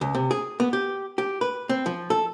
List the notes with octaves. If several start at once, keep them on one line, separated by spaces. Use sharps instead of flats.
C#2
C3
G#4
B3
G4
G4
B4
C4
F3
A4